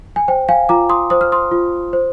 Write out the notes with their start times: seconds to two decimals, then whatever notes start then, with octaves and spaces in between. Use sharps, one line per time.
0.16 G#5
0.28 C5 G5
0.49 F5 G#5
0.69 F4 A#5 D6
0.89 C6 D#6
1.10 C5 D#6
1.21 F6
1.32 C6 D#6
1.51 F4
1.93 C5